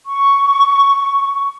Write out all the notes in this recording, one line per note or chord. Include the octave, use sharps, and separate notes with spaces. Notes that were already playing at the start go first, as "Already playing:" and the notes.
C#6